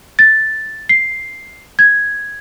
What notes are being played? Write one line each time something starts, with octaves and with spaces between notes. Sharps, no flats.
A6
C7
G#6